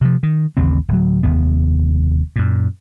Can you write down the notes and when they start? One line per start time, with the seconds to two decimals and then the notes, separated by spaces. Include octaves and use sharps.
0.01 C3 F3
0.23 D#3
0.57 A1 D#2 C#3 C4
0.88 D1 F#3
1.23 F1 D#2 B3
2.36 F#2 A#2